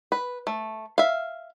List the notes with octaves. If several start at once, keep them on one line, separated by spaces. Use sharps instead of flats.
B4
A3
E5 F5